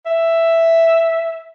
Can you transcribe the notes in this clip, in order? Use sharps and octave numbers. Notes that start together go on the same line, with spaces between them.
E5